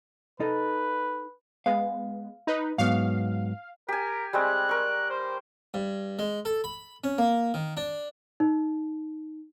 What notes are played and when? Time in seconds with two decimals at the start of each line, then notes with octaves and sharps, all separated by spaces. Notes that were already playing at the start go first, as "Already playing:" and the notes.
0.40 D#4 A4 B4 D#5
1.66 G#3 B3 F5
2.47 D#4 B4
2.78 G#2 F#3 B3 F5
3.89 G4 A#4 G#5
4.33 G3 G#3 C4 F#6
4.69 A#4 C#6
5.10 C5
5.74 G2
6.19 G#3
6.45 A4
6.64 B5
7.04 C#4
7.18 A#3
7.54 D#3
7.77 D4
8.40 D#4